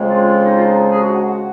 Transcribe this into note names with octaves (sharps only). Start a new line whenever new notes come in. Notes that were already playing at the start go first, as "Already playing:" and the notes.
Already playing: F2 C#3 F3 G#3
F4
F4
D#4
F4
D#4
G#4
F#4
F#4
F#4